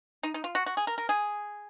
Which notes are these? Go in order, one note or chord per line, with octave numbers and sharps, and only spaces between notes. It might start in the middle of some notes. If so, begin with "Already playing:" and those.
D#4
D#4
F4
F#4
F#4
G#4
A#4
A#4
G#4